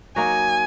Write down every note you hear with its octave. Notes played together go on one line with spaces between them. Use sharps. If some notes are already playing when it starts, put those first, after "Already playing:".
F#3 A#3 D#4 F#4 G#5